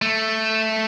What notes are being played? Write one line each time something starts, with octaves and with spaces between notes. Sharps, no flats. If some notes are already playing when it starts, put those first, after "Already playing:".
A3